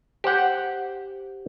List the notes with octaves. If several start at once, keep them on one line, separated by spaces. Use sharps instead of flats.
G4 C5 F#5 G5